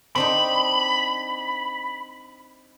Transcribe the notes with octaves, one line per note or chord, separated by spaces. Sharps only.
C4 D4 D#4 B5